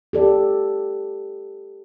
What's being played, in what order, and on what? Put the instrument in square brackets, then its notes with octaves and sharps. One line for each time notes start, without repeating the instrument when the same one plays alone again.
[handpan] G4 A4 D5